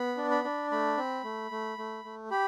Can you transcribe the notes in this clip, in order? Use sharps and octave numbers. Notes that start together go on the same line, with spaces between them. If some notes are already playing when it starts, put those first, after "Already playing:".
Already playing: B3 B5
D4
B5
D4
A3 B5
C4
A3
A3
A3
A3
G4 B5